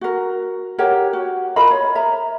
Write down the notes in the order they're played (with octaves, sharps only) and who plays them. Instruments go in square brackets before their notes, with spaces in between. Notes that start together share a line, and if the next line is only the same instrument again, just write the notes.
[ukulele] F#4 A#4
G4 A#4 C#5 F#5
F#4
F4 A#4 D#5 B5
C#5
A#4 E5 A#5